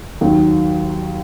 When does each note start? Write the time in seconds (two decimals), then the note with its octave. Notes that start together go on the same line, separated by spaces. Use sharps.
0.21 D#2 D#3 F#3